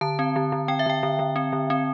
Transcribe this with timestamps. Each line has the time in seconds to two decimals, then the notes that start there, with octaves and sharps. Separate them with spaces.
0.01 D3 A5
0.19 C4
0.36 D3
0.52 D3
0.68 C4 G5
0.79 E5
0.86 D3 G5
1.03 D3
1.19 D3
1.36 C4
1.53 D3
1.70 C4